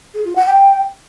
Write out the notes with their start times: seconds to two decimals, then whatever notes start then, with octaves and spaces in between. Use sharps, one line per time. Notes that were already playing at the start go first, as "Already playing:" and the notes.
0.14 G#4
0.25 F4
0.35 F#5
0.46 G5